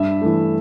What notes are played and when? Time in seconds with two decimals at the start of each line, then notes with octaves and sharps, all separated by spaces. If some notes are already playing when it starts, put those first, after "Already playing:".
Already playing: G2 E5
0.22 E3 A3